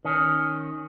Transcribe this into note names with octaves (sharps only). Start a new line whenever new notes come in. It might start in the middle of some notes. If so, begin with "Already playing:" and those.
D#3 C#4